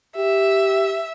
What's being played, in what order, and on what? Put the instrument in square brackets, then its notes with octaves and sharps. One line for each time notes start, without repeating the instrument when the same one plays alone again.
[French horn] G4 [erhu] E5